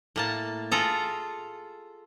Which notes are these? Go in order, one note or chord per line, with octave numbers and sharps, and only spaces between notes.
A2 A#3 A5
F4 G#4 A4 A#5